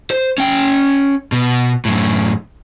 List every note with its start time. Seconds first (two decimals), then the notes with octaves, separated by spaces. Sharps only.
0.11 C5
0.38 C#4 G5
1.32 B2
1.85 F#2 A2